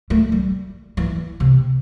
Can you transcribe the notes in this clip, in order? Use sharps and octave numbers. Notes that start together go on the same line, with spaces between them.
A3
G3
E3
C3